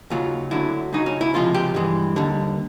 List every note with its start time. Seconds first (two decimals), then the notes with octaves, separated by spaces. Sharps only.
0.10 D#2 C#3 F#3 F4
0.51 D2 D3 F#3 E4
0.93 C#2 C#3 F#3 D#4
1.06 C#4
1.21 E4
1.34 C#2 C3 F3 G#3 F4
1.54 G4
1.75 G2 E3 G#3
2.16 D#2 D3 G3